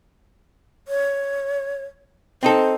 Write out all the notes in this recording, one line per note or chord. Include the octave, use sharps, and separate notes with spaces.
C#5
C4 D#4 A4 C5